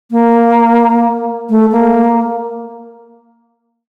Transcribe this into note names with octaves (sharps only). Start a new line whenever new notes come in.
A#3
A3
A#3